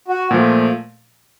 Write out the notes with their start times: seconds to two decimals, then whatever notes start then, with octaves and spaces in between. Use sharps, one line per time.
0.08 F#4
0.31 A#2 F3 A3